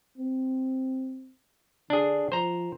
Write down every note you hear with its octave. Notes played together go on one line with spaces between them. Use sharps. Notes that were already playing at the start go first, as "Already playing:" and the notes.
C4
D3 D4 G#4
F3 C5 A#5